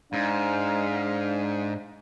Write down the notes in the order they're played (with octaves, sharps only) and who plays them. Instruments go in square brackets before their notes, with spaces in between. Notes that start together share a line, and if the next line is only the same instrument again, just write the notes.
[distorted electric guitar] G#2 [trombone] D4 [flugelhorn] F5